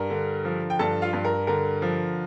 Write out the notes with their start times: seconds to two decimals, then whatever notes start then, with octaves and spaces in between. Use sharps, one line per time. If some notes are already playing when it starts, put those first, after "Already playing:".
Already playing: G2 A#4 A#5
0.10 D3
0.45 F3
0.70 G5
0.79 G2 A4 A5
1.02 F4 F5
1.13 G2
1.25 A#4
1.47 D3 A#4
1.82 F3